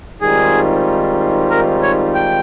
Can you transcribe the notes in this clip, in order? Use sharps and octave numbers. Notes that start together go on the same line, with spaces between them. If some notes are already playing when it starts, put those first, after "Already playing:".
G#2 D#3 G3 C4 F4 G#4
A#4
C#5
G5